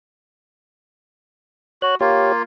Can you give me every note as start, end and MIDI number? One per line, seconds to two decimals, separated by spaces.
1.82 1.95 66
1.82 1.95 73
1.82 1.95 90
2.01 2.42 58
2.01 2.42 65
2.01 2.32 67
2.01 2.32 73